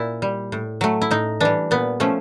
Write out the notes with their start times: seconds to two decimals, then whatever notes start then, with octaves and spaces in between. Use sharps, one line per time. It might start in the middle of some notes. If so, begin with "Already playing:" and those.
Already playing: A#2 E4
0.22 G3
0.52 A2
0.81 F#3 A3
1.02 E4
1.11 A2 D#4
1.40 E3 G3 D4
1.71 A#2 B3
2.00 F3 A3 C#4